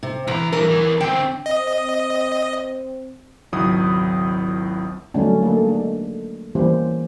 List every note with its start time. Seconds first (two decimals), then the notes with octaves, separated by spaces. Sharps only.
0.03 C3
0.27 C2 E3 A#5
0.52 E3 G3 A#4
0.71 E2 E3
1.00 D3 C4 G5
1.46 C4 D#5
3.52 G#1 C#2 F#3 E4 D#6
5.14 D3 F#3 G3 A3 C#4 D4
5.41 A3 A#3 D#4 A4
5.64 G#3 D4
6.55 E3 G3 A#3 C#4 G4 C5